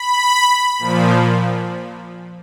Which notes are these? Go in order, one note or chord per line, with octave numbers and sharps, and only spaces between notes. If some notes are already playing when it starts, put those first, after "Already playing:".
Already playing: B5
A#2 F3